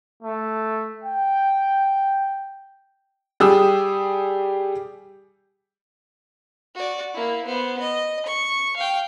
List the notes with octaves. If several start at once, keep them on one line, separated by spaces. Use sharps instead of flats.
A3
G5
G3 G4 G#4 D#6 E6
F#4 D5
A#3 E4
B3 C5
D#5
C#6
F5 G5